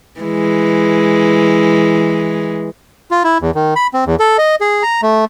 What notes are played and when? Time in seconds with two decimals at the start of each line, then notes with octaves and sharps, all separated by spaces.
0.21 E3 G#3
3.11 F4
3.24 E4
3.41 E2
3.55 D#3
3.76 B5
3.94 C4
4.06 E2
4.20 A4
4.38 D#5
4.61 G#4
4.83 A#5
5.02 A3